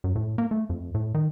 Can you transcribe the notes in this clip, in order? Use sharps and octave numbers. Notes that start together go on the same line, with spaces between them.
F#2
A2
A#3
A3
F2
A2
D#3